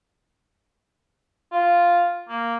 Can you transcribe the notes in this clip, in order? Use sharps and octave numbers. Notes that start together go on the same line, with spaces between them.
F4
A#3